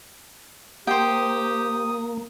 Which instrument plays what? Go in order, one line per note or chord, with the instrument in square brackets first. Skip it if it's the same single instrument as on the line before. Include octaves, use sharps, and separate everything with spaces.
[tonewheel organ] A#3 [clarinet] G4 [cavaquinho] C5 G5 [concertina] D#6